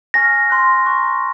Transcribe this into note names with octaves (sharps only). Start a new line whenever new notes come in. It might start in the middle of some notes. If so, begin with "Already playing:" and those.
G#5 C#6 F6 A#6
C6 F#6
A#5 C#6 F#6